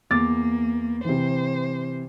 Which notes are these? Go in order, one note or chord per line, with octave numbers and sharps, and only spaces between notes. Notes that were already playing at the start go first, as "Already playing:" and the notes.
E2 A#3 D6 A6
C3 E3 C5